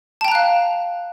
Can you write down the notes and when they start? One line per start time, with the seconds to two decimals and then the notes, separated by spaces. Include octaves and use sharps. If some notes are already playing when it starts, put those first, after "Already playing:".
0.21 A5
0.25 G5
0.28 A#5
0.32 F#6
0.35 F5